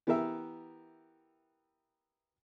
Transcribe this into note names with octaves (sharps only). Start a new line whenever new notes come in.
E3 B3 G4 A#4 E5